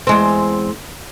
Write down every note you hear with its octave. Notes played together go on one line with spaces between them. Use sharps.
E2 G#3 C4